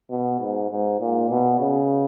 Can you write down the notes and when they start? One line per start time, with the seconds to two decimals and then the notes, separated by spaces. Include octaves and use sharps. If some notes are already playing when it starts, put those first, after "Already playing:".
0.10 B2
0.40 G#2
0.71 G#2
1.00 A#2
1.30 B2
1.60 C#3